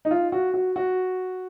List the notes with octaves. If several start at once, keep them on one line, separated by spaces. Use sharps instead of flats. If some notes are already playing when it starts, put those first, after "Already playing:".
D#4
F4
F#4
F#4
F#4